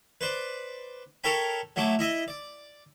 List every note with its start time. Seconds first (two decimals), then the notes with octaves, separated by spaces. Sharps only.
0.21 B4 C5 D5
1.24 A4 A#4 C#5 G5 B5
1.76 F#3 A3 E4 D6
1.99 E4 D#5 E5
2.28 D5